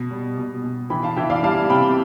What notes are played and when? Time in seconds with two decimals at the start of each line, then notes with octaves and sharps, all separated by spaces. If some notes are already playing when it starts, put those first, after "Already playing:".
Already playing: B2
0.11 G3
0.38 B2
0.64 B2
0.90 E3 G5 B5
1.03 F5 A5
1.17 E3 E5 G5
1.30 D5 F5
1.43 G3 F5 A5
1.70 C3 G5 B5